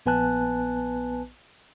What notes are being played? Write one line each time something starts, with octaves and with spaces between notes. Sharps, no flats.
A#1 B3 B4 G#5 A5 F#6